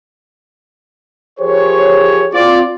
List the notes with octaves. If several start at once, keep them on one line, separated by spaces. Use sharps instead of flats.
F3 G4 G#4 A#4 C5 C#5
C4 F4 D5